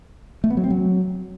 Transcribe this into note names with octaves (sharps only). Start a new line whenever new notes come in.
A3
B3
F#3
C4
F#3